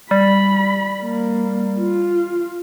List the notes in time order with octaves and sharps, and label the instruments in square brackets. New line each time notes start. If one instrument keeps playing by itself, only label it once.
[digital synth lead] G3 [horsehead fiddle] B5
[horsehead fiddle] A#3
F4